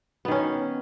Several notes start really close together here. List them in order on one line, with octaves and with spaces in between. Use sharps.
B3 D#3 C#4